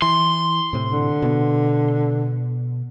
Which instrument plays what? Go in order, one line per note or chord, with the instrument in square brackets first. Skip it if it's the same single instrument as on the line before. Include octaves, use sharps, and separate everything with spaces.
[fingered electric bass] E3 [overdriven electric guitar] C6
[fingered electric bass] A2 C3
[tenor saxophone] D3
[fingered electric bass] B2 B3